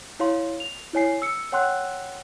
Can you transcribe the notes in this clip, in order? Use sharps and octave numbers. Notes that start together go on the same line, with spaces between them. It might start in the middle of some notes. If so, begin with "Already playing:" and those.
E4 C#5 F5 C6
F7
E4 C#5 G#5 C7
E6 C#7
C#5 F#5 G5 C6 E6 F#6